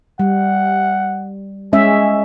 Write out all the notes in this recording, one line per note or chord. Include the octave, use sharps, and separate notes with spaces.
G3 F#5
G#3 C#4 G#4 E5